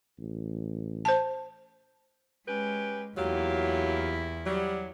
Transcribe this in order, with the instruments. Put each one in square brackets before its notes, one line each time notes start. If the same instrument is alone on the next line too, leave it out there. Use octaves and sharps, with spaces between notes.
[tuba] A1
[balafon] C5 A5
[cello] G#3 [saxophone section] C#4 G4 B4
[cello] E2 E4 [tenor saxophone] F#3 [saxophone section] A#3 F4 G4
[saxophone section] F#3 [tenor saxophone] G3